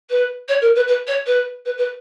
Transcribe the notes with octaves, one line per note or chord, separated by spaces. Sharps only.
B4
C#5
A#4
B4
B4
C#5
B4
B4
B4